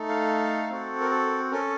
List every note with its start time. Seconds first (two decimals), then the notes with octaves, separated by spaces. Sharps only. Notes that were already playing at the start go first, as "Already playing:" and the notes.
Already playing: A3 D#4 A4
0.09 F5
0.70 C4 F#4 A4
1.01 A#4
1.11 A4
1.51 C#4 A4 A#4